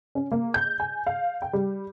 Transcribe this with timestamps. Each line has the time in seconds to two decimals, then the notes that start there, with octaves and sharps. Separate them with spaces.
0.15 C#4
0.32 A#3
0.54 G6
0.80 G#5
1.07 F5
1.42 G5
1.53 G3